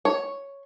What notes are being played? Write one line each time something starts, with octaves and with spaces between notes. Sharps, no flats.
C#5